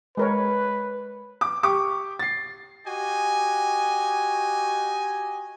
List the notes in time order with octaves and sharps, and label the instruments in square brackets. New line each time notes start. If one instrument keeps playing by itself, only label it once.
[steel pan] G#3 A#4 C#5 [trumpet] B4
[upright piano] D6
G4 C#6 D6
A6 C7
[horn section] F#4 G4 D#5 G#5